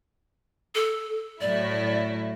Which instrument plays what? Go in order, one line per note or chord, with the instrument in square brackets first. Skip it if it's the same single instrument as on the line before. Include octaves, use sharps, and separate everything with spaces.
[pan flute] A4
[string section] A2 F#3 E4 [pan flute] D5